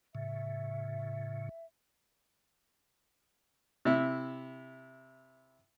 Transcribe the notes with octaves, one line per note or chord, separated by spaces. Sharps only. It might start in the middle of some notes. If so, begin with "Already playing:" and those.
A2 C#3 E5
C3 E4